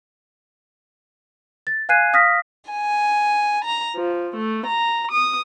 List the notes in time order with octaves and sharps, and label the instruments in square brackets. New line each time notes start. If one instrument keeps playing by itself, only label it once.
[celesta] A6
F5 G#5 F#6 G#6 C7 D#7
F5 D#6 F6 A#6 B6
[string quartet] G#5
A#5
F3
A3
A#5
D#6